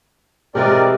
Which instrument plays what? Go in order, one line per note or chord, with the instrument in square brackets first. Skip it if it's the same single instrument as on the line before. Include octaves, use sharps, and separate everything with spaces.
[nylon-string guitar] B2 E3 G#3 [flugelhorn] C4 [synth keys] G4 [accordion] A#4 D5